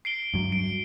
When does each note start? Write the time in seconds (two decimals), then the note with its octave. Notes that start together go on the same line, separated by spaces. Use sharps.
0.05 C7 D7 G7
0.34 G2 F#3
0.52 D7